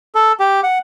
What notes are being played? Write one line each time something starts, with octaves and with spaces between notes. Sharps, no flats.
A4
G4
F#5